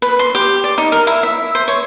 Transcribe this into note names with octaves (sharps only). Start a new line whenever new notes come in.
B4
C6
G4
D5
D#4
A#4
E4
E5
C5
C#5